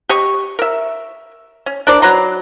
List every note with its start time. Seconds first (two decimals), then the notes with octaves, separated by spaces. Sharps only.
0.09 G4 D#5 C#6
0.59 A#4 E5
1.66 C#4
1.87 D4 A#4 C5 D5
2.02 F#3 B4 A#5 C6